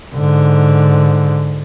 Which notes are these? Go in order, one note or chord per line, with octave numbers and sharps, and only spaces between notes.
G#2 D3